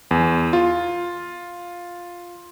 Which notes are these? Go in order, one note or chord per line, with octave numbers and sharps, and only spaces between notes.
E2
F4